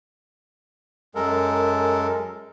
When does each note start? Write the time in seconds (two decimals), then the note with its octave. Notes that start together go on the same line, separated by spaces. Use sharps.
1.15 F#2 G#3 A4 A#4